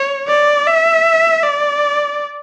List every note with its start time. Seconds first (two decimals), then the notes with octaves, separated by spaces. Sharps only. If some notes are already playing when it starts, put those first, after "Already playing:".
Already playing: C#5
0.28 D5
0.67 E5
1.43 D5